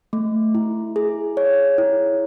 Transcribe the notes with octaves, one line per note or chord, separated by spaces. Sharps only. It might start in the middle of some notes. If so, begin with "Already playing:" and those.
A3
E4
G#4
C#5
E4